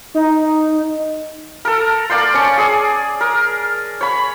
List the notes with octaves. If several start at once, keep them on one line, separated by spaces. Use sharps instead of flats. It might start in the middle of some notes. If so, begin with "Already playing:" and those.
D#4
A4 A#4
A#3 D5 G5 C6
C#4 A5 C#6
G#4 D5
A#4
C#5 B5